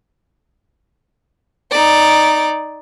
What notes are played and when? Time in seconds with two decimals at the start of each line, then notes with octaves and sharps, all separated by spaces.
1.71 D#4 D5